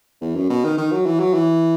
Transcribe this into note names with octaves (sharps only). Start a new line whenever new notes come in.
E2
F#2
B2
D#3
D#3
F#3
E3
F#3
E3